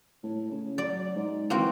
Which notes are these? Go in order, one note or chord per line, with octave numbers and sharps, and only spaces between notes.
A2
C#3
F#3 D5
G#2
E3 A#3 C4 F#4